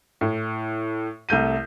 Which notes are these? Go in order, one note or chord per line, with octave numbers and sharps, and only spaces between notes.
A2
C2 A3 G6 D#7